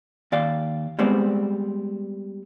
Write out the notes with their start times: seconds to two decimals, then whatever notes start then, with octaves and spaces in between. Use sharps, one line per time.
0.32 D#2 D5 F5
0.99 G3 G#3 B3 C4 C5 D5